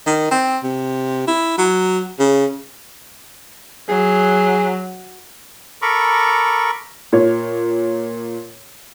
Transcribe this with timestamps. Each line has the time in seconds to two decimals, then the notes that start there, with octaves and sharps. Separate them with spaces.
0.06 D#3
0.31 C4
0.64 C3
1.28 E4
1.58 F#3
2.19 C#3
3.89 F#3 G#4
5.82 A4 A#4 A#5 B5 C#6 D6
7.13 A#2 C#5